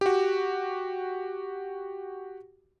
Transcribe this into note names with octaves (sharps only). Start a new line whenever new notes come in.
F#4 G4